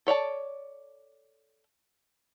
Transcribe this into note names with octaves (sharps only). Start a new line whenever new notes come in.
A4 C#5 D5 A5